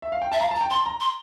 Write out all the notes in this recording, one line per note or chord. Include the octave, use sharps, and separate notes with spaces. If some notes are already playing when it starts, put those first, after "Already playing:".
E5
F5
G5
E5 A5
F5 A#5
A5
A#5
G5
A5 C6
A#5
C6